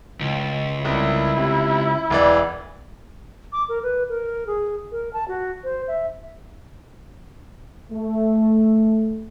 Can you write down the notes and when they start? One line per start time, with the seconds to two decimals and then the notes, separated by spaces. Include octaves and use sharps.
0.20 C#2
0.85 C2 E4
1.38 C3
2.10 E1 E3 D5
3.52 D6
3.69 A#4
3.83 B4
4.09 A#4
4.47 G#4
4.92 A#4
5.13 A5
5.28 F#4
5.64 C5
5.88 E5
7.92 A3